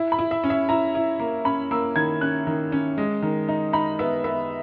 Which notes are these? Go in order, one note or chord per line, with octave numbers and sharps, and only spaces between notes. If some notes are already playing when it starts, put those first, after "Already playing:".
Already playing: E4
B5
E4
E5
C#4
E5
E4 A#5
E4
A#3
C#4 B5
A#3 E6
D#3 G#6
C#4 F#6
D#3
C#4
G#3
D#3
D#4
D#4 B5
B3 E5
B3 E5